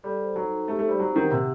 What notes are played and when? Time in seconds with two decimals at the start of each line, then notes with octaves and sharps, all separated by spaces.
0.03 G3 A4
0.21 C5
0.36 F#3 D#4
0.51 D#4
0.68 A3 G4
0.79 A3
0.84 C5
0.89 G3
1.00 F#3 C4
1.16 D#3 F#5
1.31 C3 G4